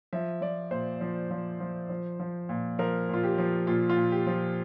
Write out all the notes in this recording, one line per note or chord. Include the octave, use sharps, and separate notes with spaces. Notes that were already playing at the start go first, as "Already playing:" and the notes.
F3 E5
F3 D5
A#2 C5
F3
F3
F3
F3
F3
A#2
F3 A#4
A#2 F4
G4
F3
A#2 F4
F4
A#2
G4
F3